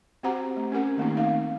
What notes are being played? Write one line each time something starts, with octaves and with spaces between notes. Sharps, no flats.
C4 F#4 G4 C5 F#5 A#5
A3
C#4 G4 A#4 F#5
D#3 A3 A#3 C4 D#4
A3 D#4 F5